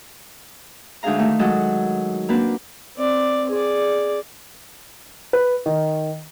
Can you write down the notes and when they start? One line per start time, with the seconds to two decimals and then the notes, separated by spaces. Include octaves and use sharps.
1.03 D2 G#2 D4 G#4 F5 A#5
1.19 D#3 A3
1.39 F#3 G#3 A4 D#5 F#5
2.29 A#3 C4 D4 F#4 B4
2.97 C4 D5
3.50 G#4 D5
5.33 B4
5.66 D#3